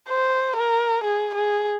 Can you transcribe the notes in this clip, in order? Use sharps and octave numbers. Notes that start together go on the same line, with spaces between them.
C5
A#4
G#4
G#4